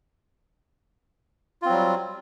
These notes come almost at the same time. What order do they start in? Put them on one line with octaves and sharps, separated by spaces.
F4 C4 F#3 G3